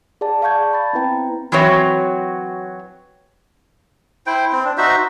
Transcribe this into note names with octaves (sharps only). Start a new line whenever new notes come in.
G#4 D5 F#5 A5
D5 F5 A5 C#6 G6 G#6
A5 B5 A6
B3 C4 E4 B4 G5 A#5
E3 F#3 C4 F#4 C#5
E4 C5 G5
C4
D4
D#4 F#4 C5 E5